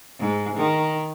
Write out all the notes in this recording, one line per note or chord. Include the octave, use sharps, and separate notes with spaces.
G#2
D#3